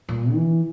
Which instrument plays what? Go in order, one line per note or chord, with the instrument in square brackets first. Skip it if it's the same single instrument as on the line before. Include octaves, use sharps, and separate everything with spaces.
[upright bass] A#2
E3